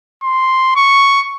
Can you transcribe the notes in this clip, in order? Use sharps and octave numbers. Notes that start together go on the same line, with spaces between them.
C6
C#6